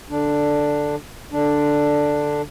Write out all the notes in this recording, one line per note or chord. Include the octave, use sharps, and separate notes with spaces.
D3 D4
D3 D4